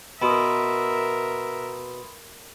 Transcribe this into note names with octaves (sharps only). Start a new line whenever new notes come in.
B2 A#4 E5 B5 C6 D#6